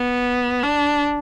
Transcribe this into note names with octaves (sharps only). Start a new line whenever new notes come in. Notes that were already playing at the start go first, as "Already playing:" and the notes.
Already playing: B3
D4